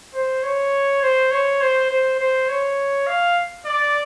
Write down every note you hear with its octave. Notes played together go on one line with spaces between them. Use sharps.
C5
C#5
C5
C#5
C5
C5
C5
C#5
F5
D5